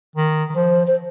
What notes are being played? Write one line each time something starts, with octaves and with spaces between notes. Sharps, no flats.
D#3
D#3
F3 C5
C5